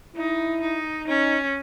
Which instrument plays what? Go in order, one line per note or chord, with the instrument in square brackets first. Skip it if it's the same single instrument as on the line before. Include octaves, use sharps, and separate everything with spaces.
[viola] D#4 [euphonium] E4
[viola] D#4
[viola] C#4 [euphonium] D#4